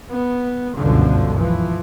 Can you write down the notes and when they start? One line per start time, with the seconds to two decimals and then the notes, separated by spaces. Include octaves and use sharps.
0.10 B3
0.76 G1 C#2 F#2 B2 D3 F3
1.37 E3 F3